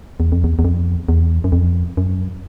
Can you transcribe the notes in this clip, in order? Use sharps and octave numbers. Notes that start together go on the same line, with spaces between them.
E2
F2
E2
E2
F2
E2
F#2
F2
F#2